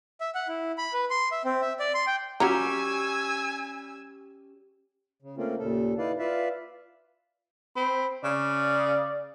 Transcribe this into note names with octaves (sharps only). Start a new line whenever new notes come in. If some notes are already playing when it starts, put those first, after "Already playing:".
E5
F#5
E4
B5
B4
C6
E5
C4
E5
D5
C6
G5
F#3 G3 C#4 F4 G4 G#5 A#5 E6
C#3
A3 A#3 C4 C#4 F4
D#2 A#2 C#3 A4
D#4 E4 B4 D5 F5
F4 B4 D5 E5 F5
C4 B5
C#3 D5